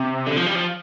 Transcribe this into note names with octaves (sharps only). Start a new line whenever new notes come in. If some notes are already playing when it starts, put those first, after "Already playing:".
Already playing: C3
D3
F3
G3
F3